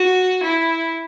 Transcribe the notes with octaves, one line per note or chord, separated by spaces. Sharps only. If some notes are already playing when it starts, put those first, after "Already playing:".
Already playing: F#4
E4